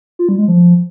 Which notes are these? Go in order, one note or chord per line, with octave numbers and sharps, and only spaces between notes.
F4
G3
G#3
F3